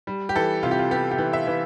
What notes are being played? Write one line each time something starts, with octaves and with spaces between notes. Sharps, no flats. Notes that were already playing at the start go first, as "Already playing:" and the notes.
G3
G4
E3 A4
C3 F4
G4
F4
B3 G4
G4
E3
E5
E3